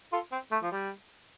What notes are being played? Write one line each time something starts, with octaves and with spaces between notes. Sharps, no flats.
F4 A4
C4
A3
F3
G3